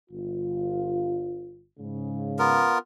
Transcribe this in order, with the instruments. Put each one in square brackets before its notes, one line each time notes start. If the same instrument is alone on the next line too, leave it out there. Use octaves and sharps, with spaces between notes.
[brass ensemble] G1 F4
G#2 C#3
[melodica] B3 F4 A#4